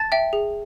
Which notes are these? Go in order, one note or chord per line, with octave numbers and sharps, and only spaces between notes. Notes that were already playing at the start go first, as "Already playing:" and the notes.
Already playing: A5 A6
E5 G5
G#4